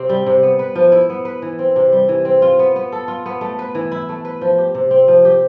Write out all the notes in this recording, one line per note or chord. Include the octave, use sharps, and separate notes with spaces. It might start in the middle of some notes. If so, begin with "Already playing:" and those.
Already playing: C3 C4
G3
C3
B3
B4
F3
E4
B3
B4
E3
C4
C3
G3
E3
C4
F4
B3
B3
A4
F4
B3
A3
B4
E3
E4
A3
B4
F3
G4
C3
C4
F3
G4